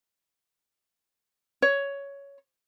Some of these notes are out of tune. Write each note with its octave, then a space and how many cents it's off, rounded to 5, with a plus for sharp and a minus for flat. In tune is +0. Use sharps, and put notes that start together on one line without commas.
C#5 +10